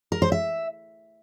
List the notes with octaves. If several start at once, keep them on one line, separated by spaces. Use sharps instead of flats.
A#4
C5
E5